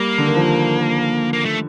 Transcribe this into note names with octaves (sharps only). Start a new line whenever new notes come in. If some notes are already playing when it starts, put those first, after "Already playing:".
Already playing: G3 A#3
D3
D#3
F3
A#3
A3